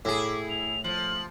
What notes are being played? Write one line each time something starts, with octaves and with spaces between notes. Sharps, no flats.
A2 E4 G#4 D6
F7
F3 F#7